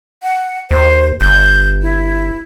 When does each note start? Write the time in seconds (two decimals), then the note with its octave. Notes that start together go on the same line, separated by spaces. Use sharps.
0.23 F#5
0.71 D#2 C5
1.21 G1 G6
1.82 E4